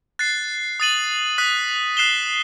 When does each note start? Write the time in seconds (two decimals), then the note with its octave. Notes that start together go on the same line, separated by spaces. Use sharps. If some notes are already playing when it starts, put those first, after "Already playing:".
0.19 F#6 A6 C7
0.80 D#6 A6 D#7 F#7
1.38 D#6 F#6 B6
1.97 F#6 C7 E7 G7